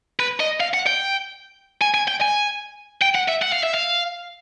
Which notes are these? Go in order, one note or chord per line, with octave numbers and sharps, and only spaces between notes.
B4
D#5
F5
F#5
G5
G#5
G#5
G5
G#5
G5
F#5
E5
F#5
F5
E5
F5